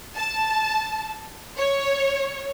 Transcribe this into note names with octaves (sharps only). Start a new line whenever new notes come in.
A5
C#5